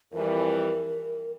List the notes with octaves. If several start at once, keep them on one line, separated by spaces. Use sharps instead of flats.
F2 E3 G3 A#4